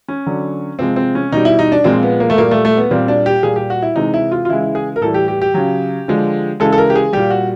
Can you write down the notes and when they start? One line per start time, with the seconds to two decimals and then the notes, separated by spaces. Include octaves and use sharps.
0.09 C#4
0.26 D3 F#3
0.79 C3 F3 G#3 C4
0.96 C4
1.15 C#4
1.32 B2 G3 D#4
1.45 E4
1.59 D#4
1.72 D4
1.84 A#2 F3 G#3 C4
2.03 B3
2.20 A#3
2.30 A3
2.38 A#2 G3 A#3
2.51 A3
2.65 A3
2.77 B3
2.91 A#2 G3 C4
3.08 D4
3.26 G4
3.43 A#2 G3 G#4
3.56 G4
3.70 F#4
3.82 E4
3.96 C3 E3 G#3 D#4
4.14 E4
4.32 F4
4.45 F4
4.49 C#3 E3 G#3 E4
4.62 E4
4.75 G#4
4.96 A#4
5.01 A2 E3 G3 A4
5.14 G4
5.28 G4
5.42 G4
5.54 C#3 F#3
6.08 D3 F3 G#3
6.60 C#3 E3 G#3 A4
6.73 A4
6.78 A#4
6.90 G4
6.95 G#4
7.13 A#2 G3 G4
7.30 F#4